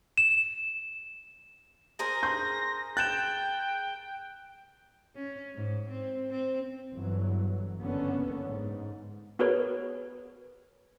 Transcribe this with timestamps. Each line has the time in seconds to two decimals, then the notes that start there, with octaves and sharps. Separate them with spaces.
0.18 E7
1.99 G#4 A#4 C5 A#6
2.23 C6 G6
2.97 G5 F#6 G6 A6 E7
5.15 C#4
5.55 G#2
5.89 C4
6.30 C4
6.92 G1 E3 F#3
7.78 F#1 D3 A#3 B3 C#4
8.46 G#2
9.39 B3 F#4 G#4 A#4 B4 C#5